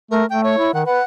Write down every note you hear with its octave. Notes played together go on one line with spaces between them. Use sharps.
A3 A#4
A3 G5
C#5
E4
D#3 F#5
B4 F#5